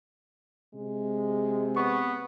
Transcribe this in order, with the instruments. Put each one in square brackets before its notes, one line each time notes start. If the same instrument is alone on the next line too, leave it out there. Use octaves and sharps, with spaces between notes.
[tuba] C3 [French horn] G#3
[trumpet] B3 [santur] C#6